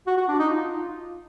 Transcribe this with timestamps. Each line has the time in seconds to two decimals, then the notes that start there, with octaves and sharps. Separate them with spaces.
0.07 F#4
0.18 F#4
0.28 D4
0.39 D#4
0.50 F4